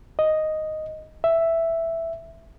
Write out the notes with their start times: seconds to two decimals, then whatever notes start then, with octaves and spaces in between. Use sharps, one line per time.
0.19 D#5
1.24 E5